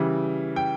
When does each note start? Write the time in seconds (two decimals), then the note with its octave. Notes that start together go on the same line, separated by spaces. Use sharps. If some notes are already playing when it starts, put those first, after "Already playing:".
Already playing: C#3 E3 G3
0.56 G5